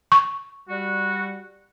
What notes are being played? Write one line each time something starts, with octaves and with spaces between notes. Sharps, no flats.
C#6
G3 F#4